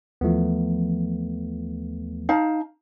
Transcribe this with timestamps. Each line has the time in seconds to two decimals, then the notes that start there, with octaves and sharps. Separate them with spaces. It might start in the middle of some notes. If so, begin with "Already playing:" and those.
0.21 D#2 E3 F3 A3 B3
2.29 D#4 F5 A5